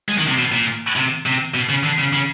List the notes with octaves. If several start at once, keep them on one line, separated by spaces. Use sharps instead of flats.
G#3
D#3
C3
B2
A#2
C3
C3
B2
C#3
D3
C#3
C#3